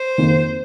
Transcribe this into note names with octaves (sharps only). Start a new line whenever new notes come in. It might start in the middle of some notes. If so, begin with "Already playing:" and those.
Already playing: C5
F2 D#3 A#3